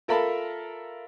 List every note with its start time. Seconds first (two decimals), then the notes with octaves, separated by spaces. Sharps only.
0.08 F4 A4 A#4 E5 A5 B5